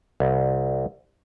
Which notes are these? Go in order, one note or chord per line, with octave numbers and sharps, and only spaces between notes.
C2